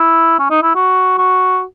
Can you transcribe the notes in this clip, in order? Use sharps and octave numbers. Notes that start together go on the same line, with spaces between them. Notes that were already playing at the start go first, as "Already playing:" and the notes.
Already playing: E4
C#4
D#4
E4
F#4
F#4